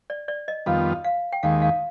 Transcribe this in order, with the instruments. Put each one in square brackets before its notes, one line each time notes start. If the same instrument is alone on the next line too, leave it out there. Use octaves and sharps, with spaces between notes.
[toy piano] D5
D5
D#5
[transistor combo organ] F2 D#3 G3 B3 F4 [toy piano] F5
[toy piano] F5
G5
[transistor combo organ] D#2 D#3 G#3 [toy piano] F5
[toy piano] F5